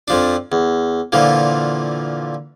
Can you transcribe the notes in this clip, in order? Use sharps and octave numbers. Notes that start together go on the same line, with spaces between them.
F2 F3 D4
E2
A#2 D3 E3 F3